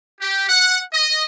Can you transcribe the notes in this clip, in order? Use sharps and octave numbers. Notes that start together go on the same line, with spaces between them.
G4
F#5
D#5